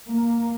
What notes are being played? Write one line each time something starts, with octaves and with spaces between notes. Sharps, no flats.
A#3